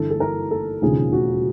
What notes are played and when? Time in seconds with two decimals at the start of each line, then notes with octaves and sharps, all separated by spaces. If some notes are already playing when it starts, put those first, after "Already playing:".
Already playing: G1 G2 E3 A4
0.11 A4
0.20 A#4
0.51 A4
0.82 E1 D#2 C#3 F3 G#4
1.12 F#4